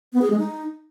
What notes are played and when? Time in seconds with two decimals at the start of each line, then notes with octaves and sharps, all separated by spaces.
0.13 B3
0.22 G#4
0.30 G#3
0.39 D#4